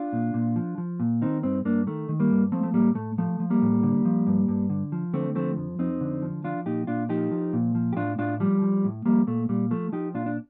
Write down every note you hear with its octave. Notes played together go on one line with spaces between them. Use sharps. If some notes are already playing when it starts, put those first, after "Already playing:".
Already playing: D4 F4
A#2
A#2
F3
F3
A#2
D#3 C4 D#4
G2 C4 D#4
G2 A#3 D4
D#3 A3
D#3
G3 A#3
G2
F3 A3 C4
A3
A2 G3 A#3
A2 A3
F3 A3
F3
G3 A#3
A2
D3
F3
G2
G2
D3
F3
D3 A3 C4
F3 A3 C4
F2
F2 C4 D#4
D3
F3
F3 D4 F4
A#2 D#4 G4
A#2 D4 F4
F3 D#4 G4
F3
A#2
F3
G4
A2 D4 F4
A2 D4 F4
F3 G3
F3
A2
F3 G3 A#3
A#2 A3
A#2 G3
F3 A3
F3 D#4 G4
A#2 D4 F4
D4